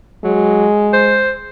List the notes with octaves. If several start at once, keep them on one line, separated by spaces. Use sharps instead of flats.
F#3 G#3
C5